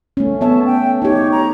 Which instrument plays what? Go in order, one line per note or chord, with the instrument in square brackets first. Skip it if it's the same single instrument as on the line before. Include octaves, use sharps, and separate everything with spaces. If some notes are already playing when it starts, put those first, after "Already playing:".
[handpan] A3 C#4
[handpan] B3 C#5 E5 [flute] A5
[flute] G5
[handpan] D#4 G4 [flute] C#5
[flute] A#5